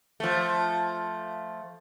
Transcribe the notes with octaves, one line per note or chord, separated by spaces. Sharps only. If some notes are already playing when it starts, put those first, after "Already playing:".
F3 A3